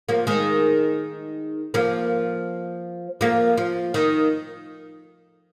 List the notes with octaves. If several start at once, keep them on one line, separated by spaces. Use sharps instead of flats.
F3 A#3
D#3 G#3
F3 A#3
F3 A#3
F3
D#3